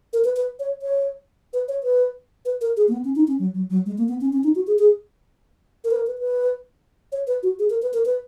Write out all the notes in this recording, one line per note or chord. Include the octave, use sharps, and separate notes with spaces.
A#4
B4
B4
C#5
C#5
B4
C#5
B4
B4
A#4
G#4
A#3
B3
C#4
D#4
C#4
F#3
F#3
F#3
G#3
A#3
B3
C#4
C#4
D#4
F#4
G#4
G#4
A#4
B4
A#4
B4
B4
C#5
B4
F#4
G#4
A#4
B4
A#4
B4